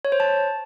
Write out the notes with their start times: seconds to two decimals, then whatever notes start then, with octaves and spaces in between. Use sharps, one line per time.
0.05 C#5
0.12 C5
0.20 A5